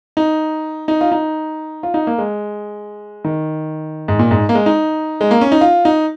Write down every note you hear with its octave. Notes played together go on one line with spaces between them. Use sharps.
D#4
D#4
F4
D#4
F4
D#4
A#3
G#3
D#3
G#2
A#2
G#2
A#3
G#3
D#4
G#3
A#3
C#4
D#4
F4
D#4